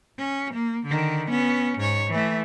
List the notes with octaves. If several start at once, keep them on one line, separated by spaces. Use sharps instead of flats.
C#4
A#3
D3 D#3
B3 C#4
G#2 C#5
E3 A3